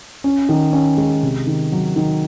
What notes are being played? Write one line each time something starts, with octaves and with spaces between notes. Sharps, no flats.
C#4
D#3
C#4
G#3
C3
D#3
F#3
D#3